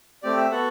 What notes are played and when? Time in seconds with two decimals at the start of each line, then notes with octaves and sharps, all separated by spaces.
0.23 A3 C4 G4 D5
0.37 E5
0.51 B3 F#4 A4 F#5